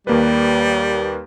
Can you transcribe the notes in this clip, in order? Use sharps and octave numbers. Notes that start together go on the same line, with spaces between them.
D#2 G3 A#3 B4